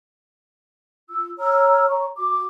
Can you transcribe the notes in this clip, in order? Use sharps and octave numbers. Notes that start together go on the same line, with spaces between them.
F4 E6
C#5 A#5 E6 F6
C#5 A#5 C#6
F#4 D6